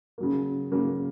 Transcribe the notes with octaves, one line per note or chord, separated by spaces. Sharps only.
C#3 F#3 A#3
C#3 F#3 A#3